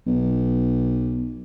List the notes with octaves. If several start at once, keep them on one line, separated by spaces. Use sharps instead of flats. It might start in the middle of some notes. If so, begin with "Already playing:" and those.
B1